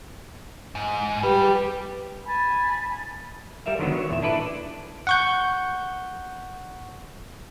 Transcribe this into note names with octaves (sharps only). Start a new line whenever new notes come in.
G#2
G3 G4 B4
G#5 A5 B5
G3 A#4 E5 F5
D3 D#3 F#3 B3
C#5
E2 A#2 E5
D4 E4 A4 B4 D5
F#5 C#6 G6